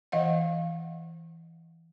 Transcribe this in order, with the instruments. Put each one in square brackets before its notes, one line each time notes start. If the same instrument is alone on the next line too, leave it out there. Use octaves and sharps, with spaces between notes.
[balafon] E3 D#5 F5 F#5